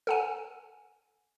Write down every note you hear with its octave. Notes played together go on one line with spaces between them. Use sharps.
A4 F#5 G#5